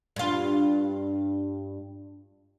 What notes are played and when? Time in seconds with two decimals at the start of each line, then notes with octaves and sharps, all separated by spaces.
0.16 G2 F4